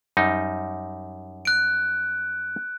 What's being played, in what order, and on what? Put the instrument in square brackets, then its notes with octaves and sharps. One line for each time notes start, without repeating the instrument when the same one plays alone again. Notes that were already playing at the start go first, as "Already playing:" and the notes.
[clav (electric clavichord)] F#2 G3 D#4
[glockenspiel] F#6 D7